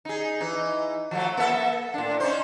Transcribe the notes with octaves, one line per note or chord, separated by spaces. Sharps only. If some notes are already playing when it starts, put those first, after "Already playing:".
D#4 G#4
E3 D#4
F3 F#3 A3
A#3 A4 E5
A2 D4
C#4 D#4 C5